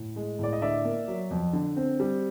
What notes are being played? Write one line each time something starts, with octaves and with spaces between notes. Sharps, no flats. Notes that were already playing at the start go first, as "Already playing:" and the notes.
Already playing: A2
G#3
A2 D5
D#5
D3 D5 E5
A#3
F#3
F2
D3
C4
G3